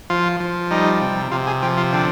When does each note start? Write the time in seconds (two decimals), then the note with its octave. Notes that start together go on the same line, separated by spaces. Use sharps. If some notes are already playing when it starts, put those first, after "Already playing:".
0.10 F3 F4
0.40 F3
0.71 G3 D#4
1.01 C3
1.32 C3 F4
1.47 G#4
1.62 F3 G4
1.77 F4
1.93 D3 G4